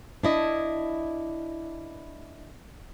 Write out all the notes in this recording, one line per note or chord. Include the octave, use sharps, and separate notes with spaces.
D4 E4 D#5